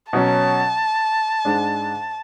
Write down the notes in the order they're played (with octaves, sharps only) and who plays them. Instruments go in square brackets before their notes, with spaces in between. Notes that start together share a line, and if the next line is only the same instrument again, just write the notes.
[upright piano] B2 F#3 C#4 [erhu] A5
[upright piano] G#2 G#3 D4